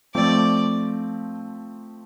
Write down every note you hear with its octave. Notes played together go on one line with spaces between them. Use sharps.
F3 A3 C4 D5